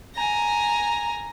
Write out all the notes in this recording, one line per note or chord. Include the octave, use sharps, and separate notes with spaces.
G#5 A#5